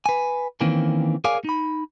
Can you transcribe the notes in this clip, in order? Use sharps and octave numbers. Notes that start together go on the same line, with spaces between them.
B4 G#5
D#3 E3 A#3 C4 C#4
G#4 A#4 C#5 D5 F5 G#5
D#4 B5